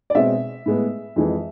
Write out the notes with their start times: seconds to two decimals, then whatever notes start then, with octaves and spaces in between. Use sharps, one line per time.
0.10 D5
0.15 B2 G#3 C4 E5
0.66 A2 G#3 B3
1.16 F2 E3 G#3